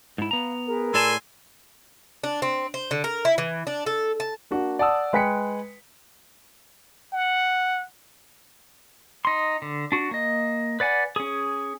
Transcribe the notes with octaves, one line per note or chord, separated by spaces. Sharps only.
G#2 E4
B3 F5 A#5
G#4 A#4 B4
A2 D5 G#5 A5 C6 E6
D4
C4
C5
D3
A#4
E4
E3
D4
A4
A5
A#3 D4 F#4
D5 F#5 A5 D#6 E6
G#3 B4 G5 B6 C#7
F#5
D#4 C6
D3
D4 F#4
A#3 D#5
B4 D5 F#5 G#5
C#4 G#4